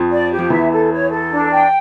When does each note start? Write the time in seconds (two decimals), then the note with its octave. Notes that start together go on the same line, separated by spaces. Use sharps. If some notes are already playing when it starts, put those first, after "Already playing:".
Already playing: F2 F3
0.10 D5
0.31 G4
0.39 F3
0.50 E2 E3 E5
0.70 A4
0.91 C#5
1.12 A4
1.31 D4
1.51 G5